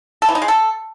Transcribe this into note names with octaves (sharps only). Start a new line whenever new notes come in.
A4
E3
D#4
G#3
A4